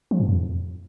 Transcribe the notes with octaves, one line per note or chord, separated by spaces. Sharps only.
F3
G2
F2